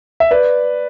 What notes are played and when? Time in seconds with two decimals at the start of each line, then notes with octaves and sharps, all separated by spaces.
0.20 E5
0.31 B4 D5